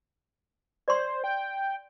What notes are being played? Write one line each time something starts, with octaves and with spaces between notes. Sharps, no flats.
C5 D5 C6
G5